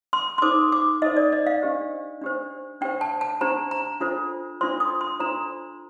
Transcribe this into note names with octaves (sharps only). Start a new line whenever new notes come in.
C6
C6
D#4 A4 C5 D6
D6
D#4 A4 C5 D#5
D5
D#5
F5
D4 G4 C5
D4 G4 C5
D4 G4 C5 G5
A5
A5
D4 G4 C5 A#5
A#5
D4 F4 A4 C5
D4 F4 A4 C5 C6
D#6
C6
D4 F4 A4 C5 A#5